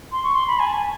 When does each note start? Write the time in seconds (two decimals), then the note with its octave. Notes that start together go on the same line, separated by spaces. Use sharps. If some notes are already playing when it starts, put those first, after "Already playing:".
0.12 C6
0.24 C#6
0.35 C6
0.47 B5
0.59 G#5
0.67 A5
0.74 G#5